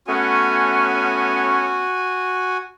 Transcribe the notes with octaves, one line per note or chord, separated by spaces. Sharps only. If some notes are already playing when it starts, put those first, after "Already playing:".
A3 B3 C#4 F#4 G#5